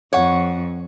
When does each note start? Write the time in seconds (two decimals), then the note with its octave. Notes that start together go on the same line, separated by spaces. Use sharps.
0.13 F2 C#5 F#5